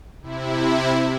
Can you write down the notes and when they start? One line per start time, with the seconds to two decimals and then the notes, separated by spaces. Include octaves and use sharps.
0.22 C3 E4